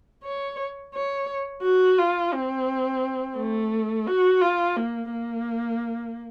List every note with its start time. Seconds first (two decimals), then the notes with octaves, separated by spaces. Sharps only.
0.24 C#5
0.94 C#5
1.63 F#4
1.98 F4
2.33 C4
3.37 A3
4.07 F#4
4.42 F4
4.76 A#3
5.11 A#3